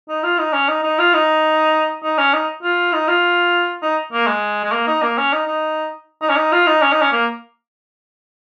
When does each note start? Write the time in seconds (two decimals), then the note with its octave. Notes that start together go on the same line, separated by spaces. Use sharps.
0.09 D#4
0.24 F4
0.39 D#4
0.53 C#4
0.68 D#4
0.83 D#4
0.99 F4
1.14 D#4
2.03 D#4
2.18 C#4
2.33 D#4
2.63 F4
2.93 D#4
3.08 F4
3.83 D#4
4.13 A#3
4.27 G#3
4.64 G#3
4.72 A#3
4.87 D#4
5.03 A#3
5.18 C#4
5.33 D#4
5.47 D#4
6.22 D#4
6.29 C#4
6.36 D#4
6.52 F4
6.67 D#4
6.82 C#4
6.92 D#4
7.02 C#4
7.12 A#3